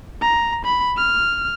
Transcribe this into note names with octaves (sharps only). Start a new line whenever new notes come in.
A#5
B5
F6